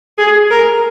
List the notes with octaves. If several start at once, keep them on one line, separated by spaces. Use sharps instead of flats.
G#4
A#4